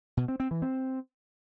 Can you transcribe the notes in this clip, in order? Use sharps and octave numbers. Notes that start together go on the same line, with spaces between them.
B2
C4
C4
E3
C4